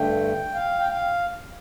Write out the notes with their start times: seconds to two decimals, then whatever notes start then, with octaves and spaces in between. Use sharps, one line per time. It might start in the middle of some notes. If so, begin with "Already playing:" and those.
Already playing: G2 D3 A3 G5
0.54 F5
0.79 G5
0.88 F5